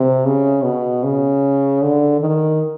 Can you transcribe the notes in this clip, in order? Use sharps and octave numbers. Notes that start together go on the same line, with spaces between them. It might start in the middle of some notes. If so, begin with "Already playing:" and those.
Already playing: C3
C#3
B2
C#3
D3
D#3